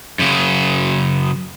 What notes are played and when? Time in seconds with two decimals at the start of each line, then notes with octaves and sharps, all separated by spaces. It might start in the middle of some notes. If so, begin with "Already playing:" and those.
0.19 F#2 C#3